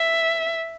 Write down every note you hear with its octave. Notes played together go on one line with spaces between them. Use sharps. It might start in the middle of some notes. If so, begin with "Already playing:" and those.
Already playing: E5